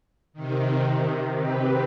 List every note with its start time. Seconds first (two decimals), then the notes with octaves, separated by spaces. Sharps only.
0.33 C3 D#3
1.34 C4 G4 B4